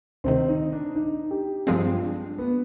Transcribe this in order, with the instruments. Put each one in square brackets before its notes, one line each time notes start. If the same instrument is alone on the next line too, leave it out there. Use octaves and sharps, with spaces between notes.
[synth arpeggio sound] D2 C3 D#3 [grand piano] C4
[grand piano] D#4
D4
D#4
G4
[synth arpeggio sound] G2 F3 G#3 C4 [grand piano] F4
[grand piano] D4
B3